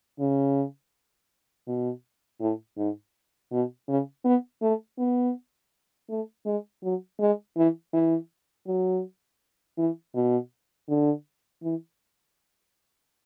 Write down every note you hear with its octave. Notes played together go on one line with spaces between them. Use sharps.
C#3
B2
A2
G#2
B2
C#3
B3
A3
B3
A3
G#3
F#3
G#3
E3
E3
F#3
E3
B2
D3
E3